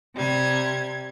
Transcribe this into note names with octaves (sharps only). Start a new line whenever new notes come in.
C3 G3 G#6